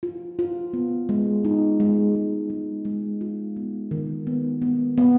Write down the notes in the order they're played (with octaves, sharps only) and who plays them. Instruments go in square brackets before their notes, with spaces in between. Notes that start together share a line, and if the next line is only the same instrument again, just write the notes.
[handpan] F4
F4
B3
G#3
D#4
G#3
G#3
G#3
G#3
F4
B3
D#3
B3
B3
B3